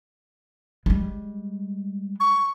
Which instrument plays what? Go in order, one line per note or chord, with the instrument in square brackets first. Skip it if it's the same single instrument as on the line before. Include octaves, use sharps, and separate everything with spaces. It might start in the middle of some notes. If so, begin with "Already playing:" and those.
[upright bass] G3 G#3
[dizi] C#6